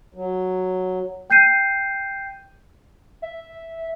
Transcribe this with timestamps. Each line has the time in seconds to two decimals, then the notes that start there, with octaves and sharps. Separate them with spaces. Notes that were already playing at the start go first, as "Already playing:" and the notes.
0.14 F#3
1.30 G5 G6 C7 D#7
3.22 E5